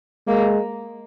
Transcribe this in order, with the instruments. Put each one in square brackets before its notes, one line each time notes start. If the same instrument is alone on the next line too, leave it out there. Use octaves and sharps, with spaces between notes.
[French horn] G#3 [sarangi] A#3